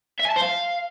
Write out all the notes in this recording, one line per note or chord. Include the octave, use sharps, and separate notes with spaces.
E5
G#5
A5
C5
F5